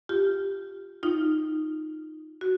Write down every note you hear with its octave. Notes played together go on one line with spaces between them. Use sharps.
F4 G4
D#4 F4
F#4